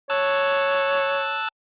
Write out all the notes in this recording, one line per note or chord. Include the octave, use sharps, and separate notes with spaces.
C#5 A5 E6 F#6